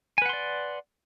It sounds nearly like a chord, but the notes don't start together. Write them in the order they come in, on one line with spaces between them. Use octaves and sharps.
G#5 B4 F#5 C6 D5